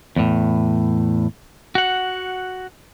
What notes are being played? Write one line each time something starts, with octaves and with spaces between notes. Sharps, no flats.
E2 A2
F#4 F#5